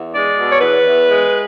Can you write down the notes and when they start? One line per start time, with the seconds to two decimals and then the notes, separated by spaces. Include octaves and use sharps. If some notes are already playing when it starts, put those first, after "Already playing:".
Already playing: E2
0.13 G#3 D5
0.37 B2
0.51 C#5
0.61 E2 B4
0.85 E2
1.09 G#3